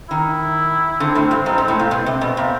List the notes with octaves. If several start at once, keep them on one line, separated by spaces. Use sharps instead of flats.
D#3 E4
D3 C4
A2
G2
G#2
G#2
A2
A#2
B2 C4
C3
B2
A#2